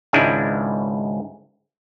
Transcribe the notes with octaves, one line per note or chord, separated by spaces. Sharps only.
G#1 C#2 G#2 G#3 D4 E4